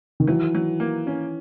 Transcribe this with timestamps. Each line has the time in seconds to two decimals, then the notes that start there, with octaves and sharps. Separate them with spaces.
0.20 D#3
0.27 E3 F#3
0.55 F#3
0.80 A#3
1.07 C#4